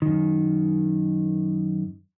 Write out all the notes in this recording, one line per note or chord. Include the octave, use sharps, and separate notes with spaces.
F#2 D#3